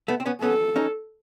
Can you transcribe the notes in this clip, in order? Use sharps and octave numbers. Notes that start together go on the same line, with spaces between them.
A3 B3
C4
B3 C#4
B3 C#4 A4
C#4 D#4